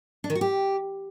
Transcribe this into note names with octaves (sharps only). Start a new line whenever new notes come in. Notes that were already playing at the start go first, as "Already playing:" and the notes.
D4
D#3
F#4
G4